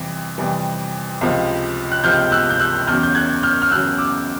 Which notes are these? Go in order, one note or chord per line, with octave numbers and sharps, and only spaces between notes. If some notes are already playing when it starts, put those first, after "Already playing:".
Already playing: F2 C3 E3 G3
F2 C3 E3 G3
C#2 C3 F3
F#6
C#2 C3 F3 F6 G6
E6 F#6
G6
E6 F#6
E2 C#3 F#3 F6 G6
G6
F#6 G#6
F6 G6
F6
E2 C#3 F#3 E6 F#6
D6 E6